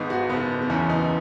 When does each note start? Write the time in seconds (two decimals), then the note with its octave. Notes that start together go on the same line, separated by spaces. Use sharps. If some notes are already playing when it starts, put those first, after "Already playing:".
Already playing: G#1 G#2 B3 D#4
0.10 F#4
0.29 F#1 B3
0.62 B3
0.70 E2 C#4
0.89 D#4